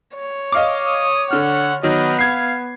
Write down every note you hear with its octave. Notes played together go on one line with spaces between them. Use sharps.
C#5
D#5 F5 D6
D#6
D3 F#5 F6
D#3 F#3 B3 D#5
F5 G#6 C7